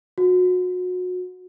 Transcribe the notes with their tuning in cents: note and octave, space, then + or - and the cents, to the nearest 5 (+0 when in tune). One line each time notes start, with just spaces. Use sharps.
F#4 -30